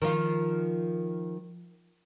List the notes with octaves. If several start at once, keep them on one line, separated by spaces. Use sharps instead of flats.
D#3 F3 F4